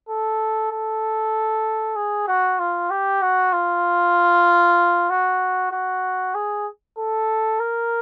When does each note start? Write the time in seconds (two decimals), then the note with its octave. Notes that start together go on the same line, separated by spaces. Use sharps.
0.09 A4
0.71 A4
1.96 G#4
2.28 F#4
2.59 F4
2.90 G4
3.22 F#4
3.53 F4
5.10 F#4
5.72 F#4
6.35 G#4
6.97 A4
7.60 A#4